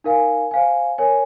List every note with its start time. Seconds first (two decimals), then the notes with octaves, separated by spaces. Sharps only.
0.04 D#4 A#4 F5 G#5
0.51 C5 F5 G#5
0.98 A#4 C#5 G#5